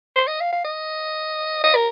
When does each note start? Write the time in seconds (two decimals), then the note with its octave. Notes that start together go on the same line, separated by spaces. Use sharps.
0.16 C5
0.27 D#5
0.40 F5
0.53 F5
0.64 D#5
1.64 D#5
1.75 A#4